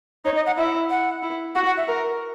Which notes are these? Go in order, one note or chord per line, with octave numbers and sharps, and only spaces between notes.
D#4 C#5
D#5
F#5
E4 E5
F#5
E4
F#4 F#5
F#5
E5
A#4